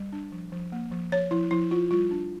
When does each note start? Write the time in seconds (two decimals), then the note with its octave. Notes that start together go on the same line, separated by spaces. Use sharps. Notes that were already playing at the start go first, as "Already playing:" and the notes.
Already playing: G3
0.13 D4
0.32 F3
0.52 F3
0.72 A#3
0.92 F3
1.12 F3 C#5
1.31 F3 E4
1.51 F3 E4
1.71 F3 F4
1.91 G3 F4
2.11 D4